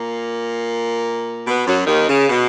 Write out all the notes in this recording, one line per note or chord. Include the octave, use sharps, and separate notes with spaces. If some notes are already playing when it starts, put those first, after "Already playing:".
Already playing: A#2 A#3
B2 B3
F#2 F#3
D#2 D#3
C#3
B2